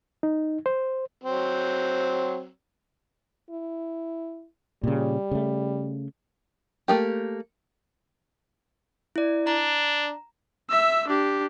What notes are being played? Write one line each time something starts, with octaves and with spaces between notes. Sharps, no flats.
D#4
C5
F#3 C4
E4
A#2 C#3 G3
C#3 A3
A3 A#3 G4
E4 D5
D4 A#5
E5 E6
D4 G4